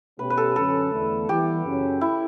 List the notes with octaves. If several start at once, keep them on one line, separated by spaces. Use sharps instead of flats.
B2 A3 C#4 G4 B4
B4
A4
F#2 D3 F#3 A3 C#4 A4
E2 D3 A3
E3 G3 B3 E4 G4
F#2 C#3 F#3 C#4
E4